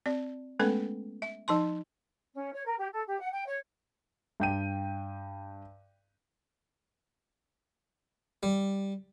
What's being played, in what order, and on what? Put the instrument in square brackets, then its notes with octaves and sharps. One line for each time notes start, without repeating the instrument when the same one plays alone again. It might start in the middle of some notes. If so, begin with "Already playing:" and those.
[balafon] C4 D5
G#3 A3 B3 C#4 A4 B4
E5
F3 D#4 A5 C6
[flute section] C#4
C#5
A#4
G4
A4
G4
F#5
G5
C#5
[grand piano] G2 G5 D#7
[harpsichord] G3